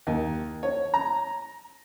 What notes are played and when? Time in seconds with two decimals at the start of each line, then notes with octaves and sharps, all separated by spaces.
0.07 D#2
0.63 C#5
0.94 A#5